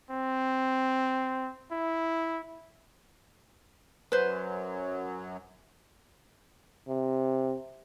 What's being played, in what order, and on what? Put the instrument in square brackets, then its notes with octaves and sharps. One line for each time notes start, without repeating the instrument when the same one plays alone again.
[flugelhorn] C4
E4
[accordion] F#2 F#3 [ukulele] B4 C5
[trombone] C3